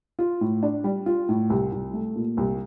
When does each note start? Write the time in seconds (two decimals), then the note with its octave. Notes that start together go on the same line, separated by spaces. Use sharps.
0.19 F4
0.41 A2
0.63 D4
0.84 G3
1.06 F4
1.29 A2
1.50 C2
1.72 C2
1.93 A3
2.16 A#2
2.37 C2